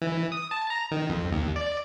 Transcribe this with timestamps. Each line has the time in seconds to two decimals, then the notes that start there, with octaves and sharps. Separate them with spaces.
0.02 E3
0.32 D#6
0.51 A5
0.70 A#5
0.91 D#3
1.09 F2
1.32 D#2
1.56 D5